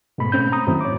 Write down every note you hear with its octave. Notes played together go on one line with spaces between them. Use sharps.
G#2 B2 A3 B5
A3 C4 C#4 B5 G6
A#5 D#6
F#2 A2 D#3 F#3 C4 E4
C#5 D6